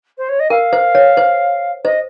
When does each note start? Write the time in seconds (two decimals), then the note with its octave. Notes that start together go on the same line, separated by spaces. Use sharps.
0.17 C5
0.28 C#5
0.39 D#5
0.50 A#4 F5
0.73 C5
0.95 C#5
1.17 C5
1.84 C5 D#5